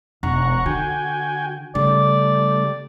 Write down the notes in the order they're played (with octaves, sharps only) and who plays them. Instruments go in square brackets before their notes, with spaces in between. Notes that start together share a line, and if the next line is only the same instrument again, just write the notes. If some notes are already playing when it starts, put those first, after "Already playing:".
[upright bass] E1 [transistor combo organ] F#5 A#5 C#6
[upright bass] D3 [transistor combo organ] F#4 G5 G#5
[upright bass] C#3 [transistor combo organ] G3 A3 [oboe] D5